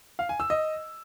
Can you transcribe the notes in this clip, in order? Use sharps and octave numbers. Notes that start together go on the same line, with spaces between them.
F5
G#5
E6
D#5